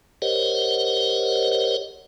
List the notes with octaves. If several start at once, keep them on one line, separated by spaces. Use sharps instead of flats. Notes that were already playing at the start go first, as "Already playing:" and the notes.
G4 A#4 C5 C#5 D#5 F#5